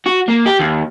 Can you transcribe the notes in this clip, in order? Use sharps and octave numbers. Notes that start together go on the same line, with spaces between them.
F#4
A#3
G4
D#2